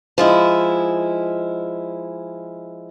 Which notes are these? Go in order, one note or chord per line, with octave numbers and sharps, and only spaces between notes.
F3 G#3 E4